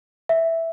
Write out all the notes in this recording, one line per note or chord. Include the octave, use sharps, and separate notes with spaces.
E5